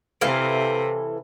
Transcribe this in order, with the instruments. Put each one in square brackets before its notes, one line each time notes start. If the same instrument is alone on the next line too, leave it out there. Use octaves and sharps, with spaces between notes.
[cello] C3 [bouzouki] E3 A4 F5